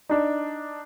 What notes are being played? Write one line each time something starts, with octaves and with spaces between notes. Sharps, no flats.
D4 D#4